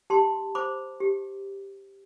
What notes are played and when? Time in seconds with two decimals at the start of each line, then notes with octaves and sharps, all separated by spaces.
0.10 G4 A5 C6
0.55 C5 B5 D6
1.00 G4